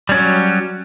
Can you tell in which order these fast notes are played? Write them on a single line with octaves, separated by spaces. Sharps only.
G3 C#4 F#3